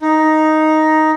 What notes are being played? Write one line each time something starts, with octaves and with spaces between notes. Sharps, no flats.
D#4